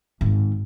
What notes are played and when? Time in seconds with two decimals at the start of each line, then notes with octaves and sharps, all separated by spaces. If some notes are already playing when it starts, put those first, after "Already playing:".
0.21 G#1